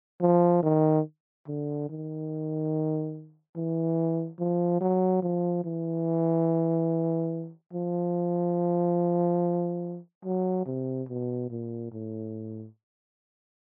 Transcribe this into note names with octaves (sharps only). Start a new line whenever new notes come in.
F3
D#3
D3
D#3
E3
F3
F#3
F3
E3
F3
F#3
C3
B2
A#2
A2